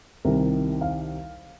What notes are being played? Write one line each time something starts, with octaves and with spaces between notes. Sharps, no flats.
C2 C3 D#3 A#4
F5